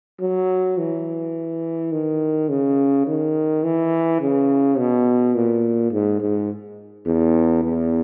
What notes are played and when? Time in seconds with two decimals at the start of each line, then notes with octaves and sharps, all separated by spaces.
0.21 F#3
0.78 E3
1.92 D#3
2.49 C#3
3.07 D#3
3.64 E3
4.21 C#3
4.78 B2
5.35 A#2
5.92 G#2
6.21 G#2
7.06 E2
7.64 E2